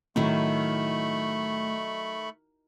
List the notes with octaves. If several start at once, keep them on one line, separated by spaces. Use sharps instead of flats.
A2 D#3 F#3 A3 E4 B5 C#6